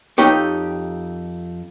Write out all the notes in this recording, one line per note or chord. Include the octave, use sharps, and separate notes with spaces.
F2 D#4 G4 C#5